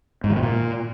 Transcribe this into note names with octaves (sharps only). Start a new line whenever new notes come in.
G#2
D#3
B2
A#2